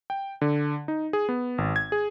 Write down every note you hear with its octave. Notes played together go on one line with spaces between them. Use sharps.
G5
D3
D#4
G#4
B3
G#1
G#6
G#4